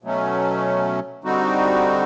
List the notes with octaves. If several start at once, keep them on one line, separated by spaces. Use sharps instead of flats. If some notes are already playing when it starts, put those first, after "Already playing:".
B2 F#3 A3 C#4
D3 G3 C4 D#4 F#4